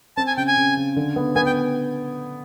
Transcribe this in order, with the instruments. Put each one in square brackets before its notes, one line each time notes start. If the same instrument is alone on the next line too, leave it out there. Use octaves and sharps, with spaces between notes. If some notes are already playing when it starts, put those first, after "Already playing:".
[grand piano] C4 [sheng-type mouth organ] A5
[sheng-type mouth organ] G#5
[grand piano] C#3 [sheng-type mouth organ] G5
[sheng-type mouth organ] G#5
[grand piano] C#3
C#3
D3
B3
[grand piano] B3 [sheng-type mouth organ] G#5
[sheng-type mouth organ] G5